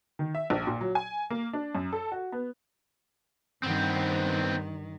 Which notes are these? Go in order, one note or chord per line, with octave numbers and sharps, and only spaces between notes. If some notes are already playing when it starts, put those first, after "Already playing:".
D#3
E5
A#1
A#2
F#3
G#5
A#3
D4
F#2
A4
F#4
B3
G2 D#3 B3 C4